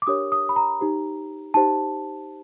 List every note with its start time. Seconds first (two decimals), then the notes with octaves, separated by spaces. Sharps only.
0.02 D6
0.07 D4 G4 A#4 C#5 D#6
0.32 D#6
0.49 B5
0.56 A#5
0.81 D#4 G4 C5
1.54 D#4 G4 C5 A5